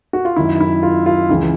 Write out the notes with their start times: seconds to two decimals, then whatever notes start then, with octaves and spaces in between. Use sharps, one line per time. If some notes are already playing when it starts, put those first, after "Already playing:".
0.13 F#4
0.25 F4
0.36 F#2 D#3 E4
0.61 E4
0.83 F4
1.06 F4
1.29 C#2 C#3 E3 E4